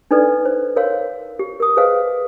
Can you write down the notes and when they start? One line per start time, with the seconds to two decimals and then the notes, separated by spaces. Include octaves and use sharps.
0.11 D4 D#4 A4 B4 D5
0.45 C5
0.76 A#4 C5 C#5 F5 C6
1.39 G4
1.60 A#4 D#6
1.77 G#4 B4 C5 D#5 F5